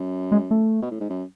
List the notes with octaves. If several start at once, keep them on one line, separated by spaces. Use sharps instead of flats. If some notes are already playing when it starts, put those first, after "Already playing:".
Already playing: F#2
G#3
A3
B2
A2
G#2
F#2